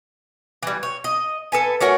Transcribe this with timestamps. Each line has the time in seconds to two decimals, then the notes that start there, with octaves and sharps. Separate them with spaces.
0.63 E3 G3
0.83 C#5
1.04 D#5
1.52 A4 B4 G#5
1.80 A3 C#4 F#4 A#4